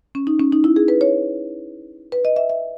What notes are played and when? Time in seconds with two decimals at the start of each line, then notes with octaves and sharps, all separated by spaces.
0.15 C#4
0.27 D#4
0.40 C#4
0.53 D#4
0.64 E4
0.76 G#4
0.88 B4
1.01 C#5
2.12 B4
2.25 D#5
2.36 E5
2.50 E5